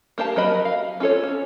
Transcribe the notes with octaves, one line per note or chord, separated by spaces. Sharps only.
A#3 G4 F5 A5
F#3 A#4 D#5 B5
F5
C#4 F4 A4 C#5
C#4